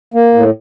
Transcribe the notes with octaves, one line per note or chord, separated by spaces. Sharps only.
A#3
A2